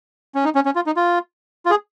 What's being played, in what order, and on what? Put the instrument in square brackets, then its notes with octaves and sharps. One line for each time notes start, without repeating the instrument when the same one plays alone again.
[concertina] C#4
D#4
C#4
C#4
F4
D#4
F4
F4
G#4